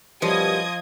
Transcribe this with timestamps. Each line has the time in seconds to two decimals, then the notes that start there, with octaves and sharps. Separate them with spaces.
0.22 F#2 B2 F3 G3 G4 D#5 D#6 G#6